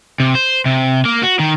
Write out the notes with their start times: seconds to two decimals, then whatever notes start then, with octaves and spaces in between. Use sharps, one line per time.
0.20 C3
0.35 C5
0.66 C3
1.05 A#3
1.22 F#4
1.39 D#3